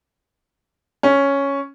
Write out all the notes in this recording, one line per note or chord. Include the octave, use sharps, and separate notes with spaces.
C#4